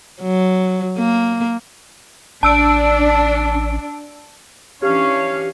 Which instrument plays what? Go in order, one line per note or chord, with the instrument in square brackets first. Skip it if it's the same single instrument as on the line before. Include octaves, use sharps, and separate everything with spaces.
[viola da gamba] F#3
A#3
[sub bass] A1 [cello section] D4 [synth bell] A5 E6 D7
[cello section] E3 C#4 D4 [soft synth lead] G4 [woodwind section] C#5 F5